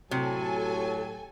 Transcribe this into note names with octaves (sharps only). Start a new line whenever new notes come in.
A2 C3 F#3 A4 G#5